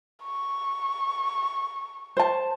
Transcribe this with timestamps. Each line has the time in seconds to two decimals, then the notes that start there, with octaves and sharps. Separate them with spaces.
0.23 C#6
2.17 C5 A5